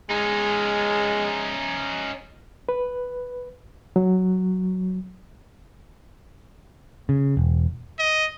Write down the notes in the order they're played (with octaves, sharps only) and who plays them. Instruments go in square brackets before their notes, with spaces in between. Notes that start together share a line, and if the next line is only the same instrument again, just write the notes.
[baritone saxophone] G#3 [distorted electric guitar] C#4 D#4
[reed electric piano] B4
F#3
[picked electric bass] C#3
E1
[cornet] D#5